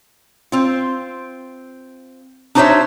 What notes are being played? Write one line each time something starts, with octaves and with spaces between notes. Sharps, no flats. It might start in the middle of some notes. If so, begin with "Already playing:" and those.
C4 F4
D4 D#4 F#4 C5 C#5 E5